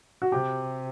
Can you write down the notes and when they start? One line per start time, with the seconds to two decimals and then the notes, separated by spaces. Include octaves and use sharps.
0.22 F#4
0.32 C3 G4